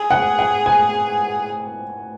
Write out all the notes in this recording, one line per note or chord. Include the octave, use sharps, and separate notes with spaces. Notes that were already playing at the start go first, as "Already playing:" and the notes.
Already playing: G#4
F#5
F#5
G#5